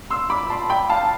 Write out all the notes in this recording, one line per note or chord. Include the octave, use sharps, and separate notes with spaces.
C6 E6
B5 D6
A5 C6
G5 B5
F5 A5